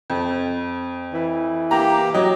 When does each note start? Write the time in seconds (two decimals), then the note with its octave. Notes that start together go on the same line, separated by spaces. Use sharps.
0.10 F2
1.14 E3
1.71 A#3 G4 A#5
2.14 F#3 D#5